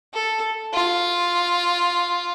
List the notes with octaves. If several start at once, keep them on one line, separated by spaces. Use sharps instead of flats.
A4
F4